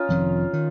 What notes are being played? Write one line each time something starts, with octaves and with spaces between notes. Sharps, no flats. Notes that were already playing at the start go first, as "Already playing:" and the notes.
Already playing: C#4 D#4 F4
F1 F2 D#3
D#3